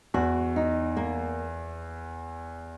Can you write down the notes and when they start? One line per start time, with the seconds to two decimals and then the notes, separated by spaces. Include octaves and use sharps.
0.14 E2 F#4
0.56 D#4
0.97 A#3